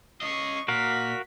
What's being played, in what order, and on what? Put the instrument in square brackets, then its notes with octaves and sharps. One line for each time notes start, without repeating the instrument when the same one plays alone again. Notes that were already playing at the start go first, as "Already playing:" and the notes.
[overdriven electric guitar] C#4 D#5 [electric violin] C#6 C7
[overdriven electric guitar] A#2 [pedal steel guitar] F#4 A#4 F5 [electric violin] B6